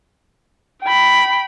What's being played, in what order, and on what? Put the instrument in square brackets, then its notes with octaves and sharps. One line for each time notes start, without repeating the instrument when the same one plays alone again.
[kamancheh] G5 B5